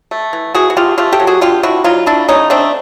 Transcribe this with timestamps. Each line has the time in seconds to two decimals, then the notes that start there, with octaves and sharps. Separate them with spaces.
0.11 A3
0.33 E3
0.55 E3 F#4 G#4
0.70 F#4
0.77 A3 F4 G4
0.98 A3 F4 G4
1.13 G4 A4
1.20 F#3
1.27 F#4 G#4
1.41 D3 F4 G4
1.63 D3 E4 F#4
1.84 F#3 D#4 F4
2.06 A3 D4 E4
2.28 C#3 C#4 D#4
2.50 A3 C4 D4